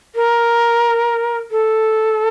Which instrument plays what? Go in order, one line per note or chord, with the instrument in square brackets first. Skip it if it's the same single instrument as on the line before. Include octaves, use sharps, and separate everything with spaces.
[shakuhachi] A#4
A4